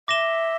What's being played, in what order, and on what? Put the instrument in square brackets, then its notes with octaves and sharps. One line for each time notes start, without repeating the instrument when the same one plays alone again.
[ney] E5 [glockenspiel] D6 A#6 E7 G7